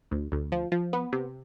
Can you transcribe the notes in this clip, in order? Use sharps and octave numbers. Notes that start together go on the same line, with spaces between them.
D2
D2
F3
F3
B3
C3